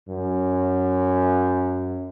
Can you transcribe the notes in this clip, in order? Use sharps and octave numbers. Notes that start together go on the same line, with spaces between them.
F#2